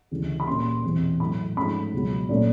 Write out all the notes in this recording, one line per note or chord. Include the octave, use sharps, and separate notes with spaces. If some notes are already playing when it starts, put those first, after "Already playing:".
D2 C#3 E3 G3
B5
A#2 G3 A#3 C#4 C6
E2 B2 G3 C4
A2 F#3 A3 B5
G#2 F3 A3 C#4 B5
C#2 B2 F#3
A#2 F#3 A3 C#4